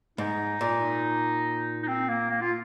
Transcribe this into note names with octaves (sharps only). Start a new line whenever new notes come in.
G#2 D#4
A#2
D#4
C4
A#3
A#3
F4